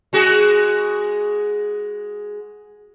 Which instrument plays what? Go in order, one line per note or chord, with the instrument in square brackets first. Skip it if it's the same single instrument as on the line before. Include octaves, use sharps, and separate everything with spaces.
[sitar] G#3 F#4 G#4